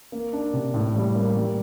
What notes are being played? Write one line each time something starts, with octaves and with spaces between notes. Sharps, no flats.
A#3
D4
C3
A2
G3
A#3
G3